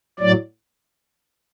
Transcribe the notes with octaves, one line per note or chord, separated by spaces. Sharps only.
A2 F#3 D5